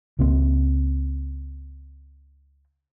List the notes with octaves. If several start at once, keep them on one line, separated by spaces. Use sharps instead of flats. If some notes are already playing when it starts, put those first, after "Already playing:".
C#2 C#3 A#3 C4